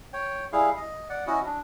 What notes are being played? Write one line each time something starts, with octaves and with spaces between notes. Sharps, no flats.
C#5 G5
G3 E4 G#4 F5
D#5
D5 F#5
C#4 E4 F#4 D#5
D4